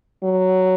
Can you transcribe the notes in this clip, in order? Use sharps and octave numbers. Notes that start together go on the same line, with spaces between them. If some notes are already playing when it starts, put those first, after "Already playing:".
F#3